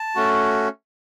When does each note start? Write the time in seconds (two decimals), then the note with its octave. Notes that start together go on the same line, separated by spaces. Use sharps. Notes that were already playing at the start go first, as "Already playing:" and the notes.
Already playing: A5
0.16 A3 C#4 F#4